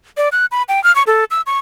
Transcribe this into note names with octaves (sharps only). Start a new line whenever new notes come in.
D5
F#6
B5
G5
F6
C#6
A4
E6
C#6